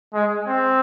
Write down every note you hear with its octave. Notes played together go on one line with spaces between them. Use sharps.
G#3
C4